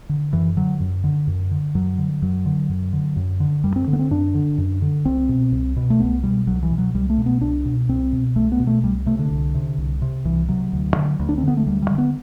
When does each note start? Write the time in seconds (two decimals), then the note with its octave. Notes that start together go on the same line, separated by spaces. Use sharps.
0.09 D3
0.33 F#2 E3
0.57 D3 F#3
0.80 F#2
1.04 D3
1.27 F#2
1.51 D3
1.75 F#2 F#3
1.98 D3
2.22 F#2 F#3
2.46 D3
2.69 F#2
2.93 D3
3.16 F#2
3.40 D3
3.64 F#2 G3
3.76 C4
3.87 D3
3.93 B3
3.99 C4
4.11 F#2 D4
4.35 D3
4.58 F#2
4.82 D3
5.05 C2 C4
5.29 B2
5.52 C2
5.76 B2
5.90 A3
6.00 C2 B3
6.23 B2 G3
6.47 C2 F#3
6.63 E3
6.71 B2
6.78 F#3
6.94 C2 G3
7.10 A3
7.18 B2
7.26 B3
7.41 C2 D4
7.65 B2
7.89 C2 C4
8.12 B2
8.36 C2 A3
8.52 B3
8.60 B2
8.67 A3
8.83 C2 G3
9.06 C3 A3
9.19 D3
9.31 C2
9.54 C3
9.78 C2
10.02 C3
10.25 C2 E3
10.49 C3 F#3
10.72 D2
10.96 D3
11.19 D2
11.29 D4
11.38 C4
11.43 D3 B3
11.57 A3
11.67 D2 G3
11.82 G3
11.90 D3
11.98 B3